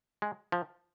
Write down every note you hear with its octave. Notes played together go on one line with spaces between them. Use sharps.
G#3
F3